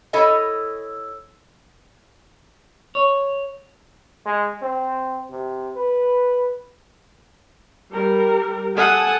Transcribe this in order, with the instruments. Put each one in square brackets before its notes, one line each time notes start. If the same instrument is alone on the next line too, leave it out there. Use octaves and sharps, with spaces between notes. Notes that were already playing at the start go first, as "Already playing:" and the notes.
[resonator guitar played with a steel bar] E4 A4 C#5 D#5 G#5
[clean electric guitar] C#5
[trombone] G#3
C4
C3
B4
[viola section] G3 A#4
[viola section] A4 G#5 [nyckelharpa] F#5 D#6